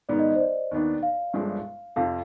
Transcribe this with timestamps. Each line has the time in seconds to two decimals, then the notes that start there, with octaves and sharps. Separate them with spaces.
0.09 G#2 D#3 B3 D5
0.19 D#5
0.31 D#5
0.36 C5
0.41 D5
0.71 D#2 D#3 B3 D4
1.03 F5
1.33 G1 G2 F3 G#3 D4
1.96 F2 C3 F3 F5